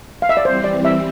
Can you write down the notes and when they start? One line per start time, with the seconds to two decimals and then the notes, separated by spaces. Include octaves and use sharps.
0.22 F5
0.29 E5
0.37 D5
0.45 E3 G3 C4 C5
0.64 D5
0.85 E5